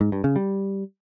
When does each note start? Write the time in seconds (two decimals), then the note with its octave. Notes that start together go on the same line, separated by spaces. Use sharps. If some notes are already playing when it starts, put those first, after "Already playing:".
0.01 G#2
0.12 G2
0.24 C#3
0.36 G3